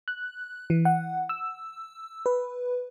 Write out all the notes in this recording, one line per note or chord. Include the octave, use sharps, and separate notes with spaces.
F#6
E3
F#5
E6
B4